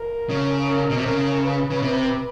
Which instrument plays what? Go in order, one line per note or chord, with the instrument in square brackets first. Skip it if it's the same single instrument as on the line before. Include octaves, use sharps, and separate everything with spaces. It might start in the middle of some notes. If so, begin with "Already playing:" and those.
Already playing: [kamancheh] A#4
[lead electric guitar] C#3
[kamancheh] A#4
[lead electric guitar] B2
C3
[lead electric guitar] C#3 [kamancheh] A#4
[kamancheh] B4
[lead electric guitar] C#3
C3